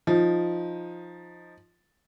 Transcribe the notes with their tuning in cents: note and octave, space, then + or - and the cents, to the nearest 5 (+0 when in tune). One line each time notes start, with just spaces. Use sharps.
F3 +0 D#4 +0